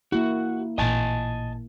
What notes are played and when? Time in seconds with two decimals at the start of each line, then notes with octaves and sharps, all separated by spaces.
0.12 A#3 E4 F#4
0.78 A1 A#2 D#5 G#5 A5